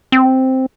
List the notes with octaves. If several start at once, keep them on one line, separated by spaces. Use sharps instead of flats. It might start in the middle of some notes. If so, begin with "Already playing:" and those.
C4